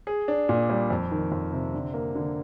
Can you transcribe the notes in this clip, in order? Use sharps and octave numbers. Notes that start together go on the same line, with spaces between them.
G#4
D4
A#2
G3
F2
D#3
F2
C3
D3
A#3
D3